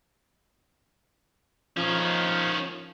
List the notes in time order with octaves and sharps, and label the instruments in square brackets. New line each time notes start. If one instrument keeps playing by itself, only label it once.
[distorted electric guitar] D#3 C#4 [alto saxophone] F3